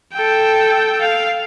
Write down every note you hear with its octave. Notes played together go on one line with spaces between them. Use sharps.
A4 G5
F5